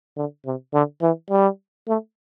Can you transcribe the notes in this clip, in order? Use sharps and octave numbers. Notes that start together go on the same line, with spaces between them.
D3
C3
D3
E3
G3
A3